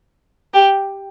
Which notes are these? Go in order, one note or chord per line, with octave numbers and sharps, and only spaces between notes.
G4